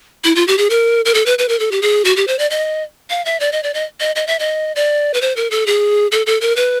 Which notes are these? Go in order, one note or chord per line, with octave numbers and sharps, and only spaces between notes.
E4
F4
G4
G#4
A#4
A#4
A4
B4
B4
A#4
A4
G4
G#4
F#4
G4
C5
D5
D#5
F5
E5
D5
D#5
D5
D#5
D#5
D#5
E5
D#5
D5
B4
C5
A#4
A4
G#4
A4
A4
A#4
B4